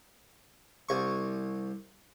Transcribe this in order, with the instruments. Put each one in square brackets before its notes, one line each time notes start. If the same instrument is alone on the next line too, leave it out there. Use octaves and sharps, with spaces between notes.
[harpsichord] C2 C#6